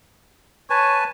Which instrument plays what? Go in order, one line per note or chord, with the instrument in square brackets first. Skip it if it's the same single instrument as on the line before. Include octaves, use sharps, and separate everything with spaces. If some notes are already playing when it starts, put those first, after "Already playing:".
[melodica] B4 G#5 A5 [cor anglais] C#5